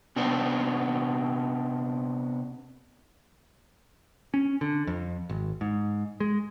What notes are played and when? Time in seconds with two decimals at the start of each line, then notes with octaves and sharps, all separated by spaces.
0.16 C3 B3 C4 D4
4.34 C#4
4.61 D3
4.87 F2
5.29 G#1
5.61 G#2
6.20 G#3